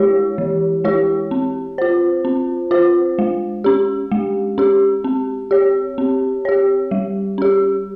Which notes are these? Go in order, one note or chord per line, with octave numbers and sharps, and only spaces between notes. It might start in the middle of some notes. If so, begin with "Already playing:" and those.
Already playing: G#3 E4 G4 C#5
E3
G#3 E4 G4 C#5
C4
F4 C5
C4
F4 C5
G#3
C#4 G4
G#3
C#4 G4
C4
G4 C#5
C4
G4 C#5
G3
C#4 G4